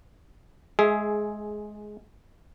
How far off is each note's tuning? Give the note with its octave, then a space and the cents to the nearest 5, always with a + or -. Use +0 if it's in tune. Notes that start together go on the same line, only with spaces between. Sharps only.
G#3 +15 G#4 +5 E5 +0